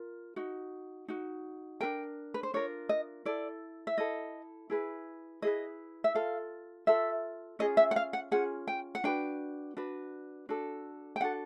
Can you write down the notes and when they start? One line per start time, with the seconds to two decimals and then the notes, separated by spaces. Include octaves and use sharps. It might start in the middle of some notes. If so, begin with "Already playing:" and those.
Already playing: F4 A#4
0.36 D#4 F#4
1.08 D#4 F#4
1.81 D4 F4 A#4 G5
2.34 B4
2.43 C5
2.54 D4 F4 A#4 C#5
2.89 D#5
3.25 E4 A4 D5
3.87 E5
3.98 E4 A4 D#5
4.70 E4 G#4 B4
5.42 E4 G#4 B4 D#5
6.04 E5
6.15 F4 A4 F5
6.87 F4 A4 E5
7.59 C#4 F4 G#4 D#5
7.77 E5
7.91 F#5
7.96 F5
8.13 F#5
8.31 C#4 F4 G#4 F#5
8.68 G5
8.95 F#5
9.04 D4 F#4 B4 G5
9.77 D4 F#4 B4
10.49 D4 F#4 A4
11.16 G5
11.21 D4 F#4 A4 F#5